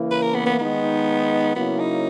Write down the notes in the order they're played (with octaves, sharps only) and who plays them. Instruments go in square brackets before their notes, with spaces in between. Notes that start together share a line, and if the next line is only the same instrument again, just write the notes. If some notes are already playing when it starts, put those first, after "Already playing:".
Already playing: [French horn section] C#3 E3 A#3 E4
[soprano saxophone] B4
A#4
B3
B3
[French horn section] D#3 G#3 D#4 [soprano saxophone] B3
[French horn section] C#3 F#3 A#3 E4 [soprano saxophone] B3
[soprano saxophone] D#4